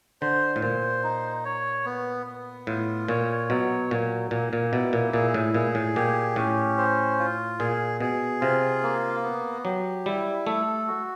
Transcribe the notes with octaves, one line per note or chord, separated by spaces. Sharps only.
D3 C5
A2
A#2 C5
D#4
C#5
B3
B3
A2 F4
A#2 C#5
B2 F#3
A#2 F#3
A#2 A#3
A#2
B2 E4
A#2
A#2 G#4
A2
A#2 G#4
A2
A#2 G4
A2 C#4
C5
F4
A#2 G#4
B2 G#4
C3 F4
A#3
B3
F#3 G4
G3 E4
A3 A4
F#4